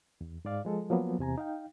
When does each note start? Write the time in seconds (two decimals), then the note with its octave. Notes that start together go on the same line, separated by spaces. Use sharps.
0.21 E2
0.45 G#2 G#3 D5 F5
0.65 F3 G#3 A4
0.90 F3 F#3 A#3 B3
1.19 E2 C3 G#5 A#5
1.38 D#4 F5 G5